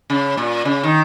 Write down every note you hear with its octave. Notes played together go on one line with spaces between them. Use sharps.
C#3
A#2
C#3
D#3